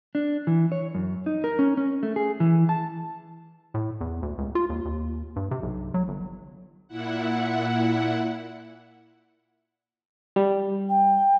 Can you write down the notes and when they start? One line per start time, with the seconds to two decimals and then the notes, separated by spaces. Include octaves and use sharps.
0.15 D4
0.47 E3
0.72 C#5
0.95 F#2
1.26 D#4
1.44 A#4
1.59 C#4
1.77 C#4
2.03 A3
2.16 G#4
2.40 E3
2.69 A5
3.74 A2
4.01 E2
4.22 D2
4.38 C#2
4.55 F4
4.70 D#2
4.85 D#2
5.36 G2
5.51 C3
5.63 B1
5.94 F#3
6.08 G1
6.88 A#2 E4 F#5
10.36 G3
10.89 G5